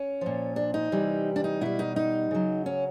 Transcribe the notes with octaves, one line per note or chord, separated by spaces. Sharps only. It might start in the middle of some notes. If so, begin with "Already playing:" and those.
Already playing: C#4
A#2 F3
D4
D#4
C3 E3 G3
D4
D#4
B2 G3 E4
D#4
D#4
C#3 F#3
C#4